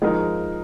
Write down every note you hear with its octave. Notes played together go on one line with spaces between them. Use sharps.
F3 G#3 D#4 A#4